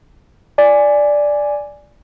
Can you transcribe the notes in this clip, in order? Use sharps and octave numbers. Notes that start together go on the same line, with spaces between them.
D5 G#5